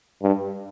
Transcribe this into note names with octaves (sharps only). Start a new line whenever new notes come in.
G2